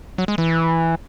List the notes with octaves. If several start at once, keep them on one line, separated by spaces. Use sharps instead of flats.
F#3
G#3
E3